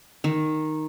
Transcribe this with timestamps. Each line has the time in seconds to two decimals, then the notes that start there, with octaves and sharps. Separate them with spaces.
0.24 D#3